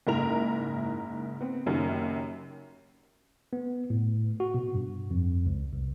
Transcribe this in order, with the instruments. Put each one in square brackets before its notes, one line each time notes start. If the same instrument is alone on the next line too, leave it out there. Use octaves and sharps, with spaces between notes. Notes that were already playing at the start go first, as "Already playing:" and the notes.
[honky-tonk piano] F#1 G#2 E4 A#4 F7
B3 C4
F#1 F#2 D#3 F#3 G3
[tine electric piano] B3
A2
F#4
B2
G2
F2
C#2
C2